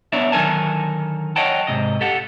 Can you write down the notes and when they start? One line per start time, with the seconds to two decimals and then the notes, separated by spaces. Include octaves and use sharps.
0.12 B3 D4 C#5 D5 E5
0.32 D3 D#3 F#3 A#4 G#5 A5
1.36 C#5 D#5 F#5 G5 A5
1.67 G#2 C3 D#5
2.01 G4 A4 F#5